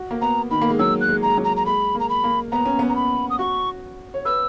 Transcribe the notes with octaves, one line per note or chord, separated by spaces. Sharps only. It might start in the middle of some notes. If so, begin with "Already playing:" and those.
Already playing: F#4
A#3
B3 A#5
D#3 B5
A#3
G#3
F#3 E6
F#6
G#3
G#3 A#5
F#3
A#5
A#5
G#3 B5
A#3
A#5
B5
A#3
B3 A#5
C#4
B3
A#5
B5
D#6
F#4 C#6
C#5
B4 E6